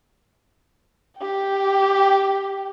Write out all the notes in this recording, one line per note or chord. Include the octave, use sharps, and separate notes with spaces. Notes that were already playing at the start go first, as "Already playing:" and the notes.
G4 G5